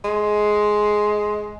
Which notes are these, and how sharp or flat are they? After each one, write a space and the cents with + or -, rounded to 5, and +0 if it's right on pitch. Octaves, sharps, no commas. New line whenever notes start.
G#3 +10